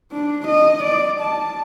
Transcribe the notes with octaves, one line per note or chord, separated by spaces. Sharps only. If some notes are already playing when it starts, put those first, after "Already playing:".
D4
D#5
D5
A5